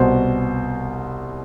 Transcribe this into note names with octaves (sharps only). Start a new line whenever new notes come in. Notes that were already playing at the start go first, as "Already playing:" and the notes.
Already playing: C2 B2 C5